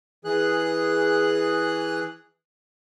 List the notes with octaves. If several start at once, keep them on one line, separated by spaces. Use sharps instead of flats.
E3 G#4 F#6